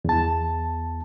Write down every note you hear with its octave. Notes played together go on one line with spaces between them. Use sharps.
E2 A5